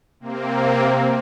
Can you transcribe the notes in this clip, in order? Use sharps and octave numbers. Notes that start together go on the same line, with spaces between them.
C3 A#3 C4